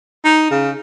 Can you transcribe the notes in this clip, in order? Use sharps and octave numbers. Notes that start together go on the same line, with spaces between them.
D#4
C#3